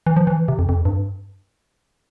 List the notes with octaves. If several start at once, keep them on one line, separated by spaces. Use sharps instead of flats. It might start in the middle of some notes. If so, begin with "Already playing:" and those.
E3
F3
E3
C3
F2
F2
G2